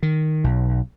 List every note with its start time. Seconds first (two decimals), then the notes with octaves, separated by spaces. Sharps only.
0.03 D#3
0.44 B1